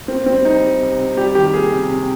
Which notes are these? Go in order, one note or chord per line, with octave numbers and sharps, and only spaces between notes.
A#3 C4
G3 C4
G3 D#4
G3
C3
C3
G3 G4
D#3 G4
A#3 G#4
C3
C3